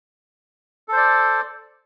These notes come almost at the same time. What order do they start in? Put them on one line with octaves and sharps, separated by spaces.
A4 C5 D5